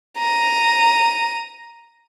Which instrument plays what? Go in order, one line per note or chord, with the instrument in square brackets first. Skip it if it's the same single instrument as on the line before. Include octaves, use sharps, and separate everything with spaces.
[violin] A#5 D#7